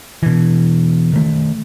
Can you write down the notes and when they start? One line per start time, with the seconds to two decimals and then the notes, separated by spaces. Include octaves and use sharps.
0.23 B2 E3
1.13 D#3 A3